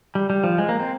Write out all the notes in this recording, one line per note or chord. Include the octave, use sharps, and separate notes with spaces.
G3
G3
F3
G#3
A#3
C4